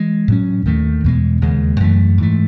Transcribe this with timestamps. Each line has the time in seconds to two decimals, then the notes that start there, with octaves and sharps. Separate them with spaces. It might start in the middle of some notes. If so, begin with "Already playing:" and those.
Already playing: E3 G#3
0.28 A2 F#3 C#4
0.65 D#2 D#3 A3
1.04 E2 B2 G#3
1.42 D#2 C#3 G#3
1.80 F#2 E3 A3
2.18 G#2 E3 A3